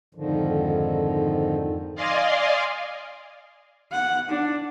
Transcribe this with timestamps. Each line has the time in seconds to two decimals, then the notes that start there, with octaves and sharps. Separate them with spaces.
0.15 F2 G#2 D3 D#3 F3
1.95 D5 D#5 F5 G#5 C6
3.92 F#5
4.29 D4